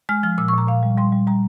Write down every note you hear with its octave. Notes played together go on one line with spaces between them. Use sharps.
G#3 F6
F3 F6
A#2 E6
C#6
A#2 A#5
A#2 F5
G3
G3 C6
G3
G3 A#5